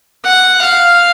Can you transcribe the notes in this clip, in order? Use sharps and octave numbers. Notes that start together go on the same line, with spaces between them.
F#5
F5